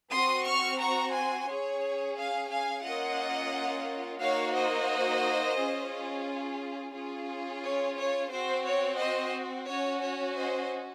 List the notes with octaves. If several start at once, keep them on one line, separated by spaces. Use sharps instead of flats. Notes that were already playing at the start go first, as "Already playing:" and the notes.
C4 F#4 C6 D#6
C#6 F6
A#5 C#6
G#5 C6
C#4 G#4 C#5
F5 G#5
F5 G#5
A#3 C#4 F4 D#5 F#5
A#3 D#4 F#4 C#5 F5
C5 D#5
C#4 F4 G#4
C#4 F4 G#4
C#5
C#5
C4 F#4 C5
C#5
C5 D#5
C#4 F#4 C#5
C#5
C5 D#5